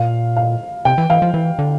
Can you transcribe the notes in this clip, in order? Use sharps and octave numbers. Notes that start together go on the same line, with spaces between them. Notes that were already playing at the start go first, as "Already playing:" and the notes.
Already playing: A#2 F5
F5
C3 G5
E3
E3 F5
F3
E3
D3